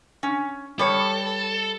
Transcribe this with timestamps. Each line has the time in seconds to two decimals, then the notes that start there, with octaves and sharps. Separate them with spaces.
0.23 C#4
0.79 G3 A4 B4 C#5